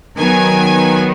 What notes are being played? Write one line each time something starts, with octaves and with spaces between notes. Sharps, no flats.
D#3 F#3 B3 G#5